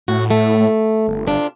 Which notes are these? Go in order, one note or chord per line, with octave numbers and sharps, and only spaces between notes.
A2 F#4
A3
G1
C3 D4 F4